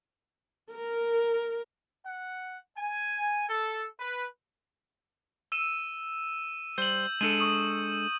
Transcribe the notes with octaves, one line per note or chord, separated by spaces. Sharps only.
A#4
F#5
G#5
A4
B4
E6 D#7 E7
G3 C5 G6 F#7
G#3 D4 A4 D#7
C#6 D#6